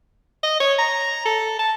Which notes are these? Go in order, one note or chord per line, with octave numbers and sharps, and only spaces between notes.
D#5
C#5
A#5
A4
A5